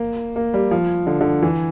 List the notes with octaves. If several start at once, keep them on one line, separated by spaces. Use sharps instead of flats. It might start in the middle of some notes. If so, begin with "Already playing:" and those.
Already playing: A#3
A#3
G3
F3
D3
D3
E3